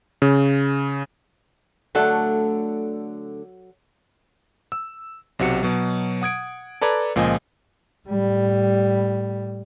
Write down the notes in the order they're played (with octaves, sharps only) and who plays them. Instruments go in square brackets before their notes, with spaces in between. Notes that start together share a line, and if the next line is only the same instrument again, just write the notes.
[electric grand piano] C#3
[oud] D3 A3 D4 [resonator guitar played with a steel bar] F#3 A4 F#5
[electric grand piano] E6
B1 C3 F#4 C#7
B2 F#3
F#5 D#6 G#6 D7
A4 B4 D5 A#5 G#6
C#2 A#2 F3 D#5 G#5
[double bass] A2 G3